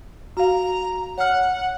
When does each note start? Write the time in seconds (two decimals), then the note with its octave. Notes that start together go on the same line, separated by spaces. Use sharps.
0.37 F#4 F5 A#5
1.18 C#5 F#5 F6